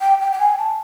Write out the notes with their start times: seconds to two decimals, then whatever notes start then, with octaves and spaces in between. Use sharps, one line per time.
0.01 G5
0.21 G5
0.32 G5
0.39 G#5
0.58 A5